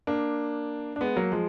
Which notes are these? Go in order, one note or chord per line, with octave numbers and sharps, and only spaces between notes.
A#3 D4
D4
G#3 B3
F#3 A#3
F3 G#3